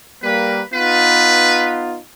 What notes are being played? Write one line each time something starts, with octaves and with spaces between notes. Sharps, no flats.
G3 A#3 B4
B3 D#4 F4 B4